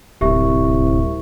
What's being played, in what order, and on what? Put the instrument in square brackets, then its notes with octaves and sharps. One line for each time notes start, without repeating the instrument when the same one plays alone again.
[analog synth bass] D1 [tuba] C2 [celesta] G4 E5 C#6